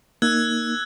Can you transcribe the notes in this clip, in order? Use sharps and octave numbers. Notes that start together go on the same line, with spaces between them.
A#3 D#4 E6 F#6 G#6